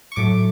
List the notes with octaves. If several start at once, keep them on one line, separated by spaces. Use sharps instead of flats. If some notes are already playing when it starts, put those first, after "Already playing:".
C#6
A2 F#3 A3 D6